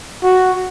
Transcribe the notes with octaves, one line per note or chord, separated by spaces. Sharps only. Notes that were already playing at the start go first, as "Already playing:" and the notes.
F#4